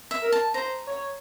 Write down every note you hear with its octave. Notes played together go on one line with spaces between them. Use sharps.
E5
A#4
A5
C5 A#5
C#5